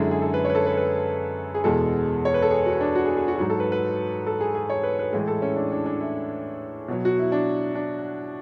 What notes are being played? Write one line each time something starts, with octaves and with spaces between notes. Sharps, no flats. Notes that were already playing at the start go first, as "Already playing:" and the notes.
Already playing: F#2 D3 G#3 E4
G#4
A4
B4
C#5
B4
A4
B4
B4
G#4
E2 B2 G#3 A4
C#5
B4
A4
G#4
F#4
D4
F#4
G#4
G#4
F#4
G#2 F#3 F#4
A4
B4
B4
A4
G#4
G#4
C#5
B4
B4
A2 E3 G#3
A4
C#4
D4
D4
D4
E4
B2 F#3
F#4
E4
D4
D4